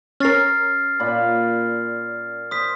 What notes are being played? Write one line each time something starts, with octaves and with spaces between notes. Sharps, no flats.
C#4 A#4 F6 A6 C7
A#2 D5 B5
C5 D#6 B6